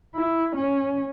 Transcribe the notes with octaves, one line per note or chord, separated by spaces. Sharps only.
E4
C#4